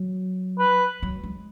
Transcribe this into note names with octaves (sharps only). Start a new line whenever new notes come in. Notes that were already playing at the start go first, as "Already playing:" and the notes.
Already playing: F#3
B4
F#3
G#3